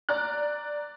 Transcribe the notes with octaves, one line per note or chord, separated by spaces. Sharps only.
D5 A#5 F#6